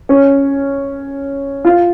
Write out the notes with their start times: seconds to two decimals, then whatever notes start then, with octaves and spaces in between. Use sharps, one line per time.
0.09 C#4
1.65 F4